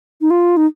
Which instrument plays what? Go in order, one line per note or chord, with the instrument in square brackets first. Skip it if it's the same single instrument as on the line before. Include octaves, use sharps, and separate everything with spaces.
[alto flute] D#4
F4
D#4